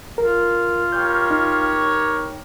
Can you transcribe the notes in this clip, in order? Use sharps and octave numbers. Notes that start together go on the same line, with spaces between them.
F4 A#4
G4 A#4 C#5 G6
D#4